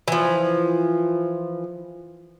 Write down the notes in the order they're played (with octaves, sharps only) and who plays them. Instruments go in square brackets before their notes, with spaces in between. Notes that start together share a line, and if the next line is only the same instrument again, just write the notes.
[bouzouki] E3 F3